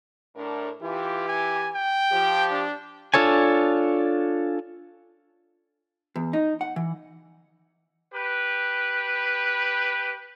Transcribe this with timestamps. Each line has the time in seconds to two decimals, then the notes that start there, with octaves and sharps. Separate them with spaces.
0.36 A2 D4 A#4
0.82 E3 F4 G4
1.28 G#5
1.74 G5
2.13 F3 G4
2.51 D4
3.14 D4 F4 A4 C#5 G#5
6.16 E2
6.33 D#4
6.61 F#5
6.76 E3
8.14 G4 B4